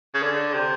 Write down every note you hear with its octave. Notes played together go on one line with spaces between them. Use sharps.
C#3
D3
C3